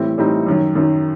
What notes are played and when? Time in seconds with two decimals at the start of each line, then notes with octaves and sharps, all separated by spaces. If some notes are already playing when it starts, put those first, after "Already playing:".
Already playing: A2 E3 G3 C4
0.18 A2 E3 G3 C4 D#4
0.46 F#2 D#3 F#3
0.75 F#2 D#3 F#3